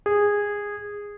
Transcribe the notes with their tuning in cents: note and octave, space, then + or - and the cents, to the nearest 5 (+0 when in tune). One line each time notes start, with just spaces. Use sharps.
G#4 -15